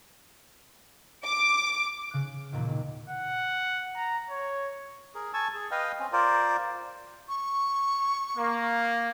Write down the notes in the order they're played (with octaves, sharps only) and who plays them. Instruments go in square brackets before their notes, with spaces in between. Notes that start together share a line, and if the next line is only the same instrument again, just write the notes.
[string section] D6
[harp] C#3 F#6
E1 D#2 A#2
[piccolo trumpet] F#5
A#5
C#5
[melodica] G#4 A#4
G#5 A5 C#6 E6
G#4
B4 D#5 F5 G5
C4 C#4
F4 A#4 C5 D5
[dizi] C#6
[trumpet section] A#3